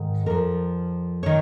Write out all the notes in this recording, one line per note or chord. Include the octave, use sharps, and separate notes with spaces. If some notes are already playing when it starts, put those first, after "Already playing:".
Already playing: G#2 D#3
F2 F3 A#4
D#3 C#5